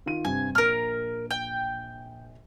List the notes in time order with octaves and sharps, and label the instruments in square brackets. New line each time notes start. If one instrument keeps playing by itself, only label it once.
[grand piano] D#3 F4 D#7
[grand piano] G2 C3 [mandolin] G#5
[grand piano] A#1 D7 [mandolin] A#4 F6
[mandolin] G5